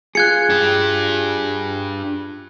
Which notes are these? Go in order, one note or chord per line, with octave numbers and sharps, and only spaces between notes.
F4 G#4 F#6 G#6 C#7
D4 G4